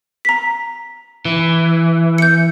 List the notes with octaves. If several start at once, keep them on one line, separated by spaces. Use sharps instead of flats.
A#5 B6
E3
G6 C#7